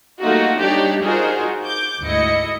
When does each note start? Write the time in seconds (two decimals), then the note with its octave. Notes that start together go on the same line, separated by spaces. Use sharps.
0.21 G3 A3 A#3 D#4 F4 F#4
0.61 G3 D4 D#4 G4 C#5 D5
1.02 D#4 F4 F#4 G#4 A#4 C5
1.64 D6 G6
2.02 D2 G#2 E4 D#5 C#7